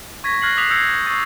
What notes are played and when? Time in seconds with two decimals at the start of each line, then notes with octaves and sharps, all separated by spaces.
0.24 C#6 G#6 A#6 B6
0.42 F6 F#6 G#6 A#6 C7 F#7
0.57 D6 D#6 F#6 B6 C7 F7
0.70 E6 F6 G6 A#6 C7 C#7
1.06 C#6 A6 C7